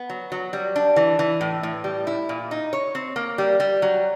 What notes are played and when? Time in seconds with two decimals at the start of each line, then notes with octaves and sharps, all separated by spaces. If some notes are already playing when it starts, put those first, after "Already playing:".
Already playing: B3
0.10 F#3
0.32 F#3
0.53 G3
0.76 D4
0.96 E3
1.19 E3
1.41 A2
1.63 A2
1.84 G3
2.07 E4
2.29 A#2
2.51 D#4
2.73 C#5
2.95 C4
3.16 A#3
3.38 G3
3.60 G3
3.82 F#3